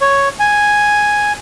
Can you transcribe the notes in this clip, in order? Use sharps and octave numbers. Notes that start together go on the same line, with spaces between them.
C#5
G#5